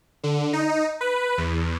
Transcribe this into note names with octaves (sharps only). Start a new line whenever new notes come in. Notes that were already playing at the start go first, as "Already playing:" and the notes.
D3
D#4
B4
E2